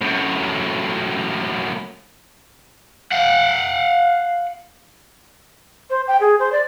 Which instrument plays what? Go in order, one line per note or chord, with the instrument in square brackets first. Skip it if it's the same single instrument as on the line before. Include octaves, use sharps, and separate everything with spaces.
[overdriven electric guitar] F#2 A2
F5 F#5
[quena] C5
G5
G#4
C5
D5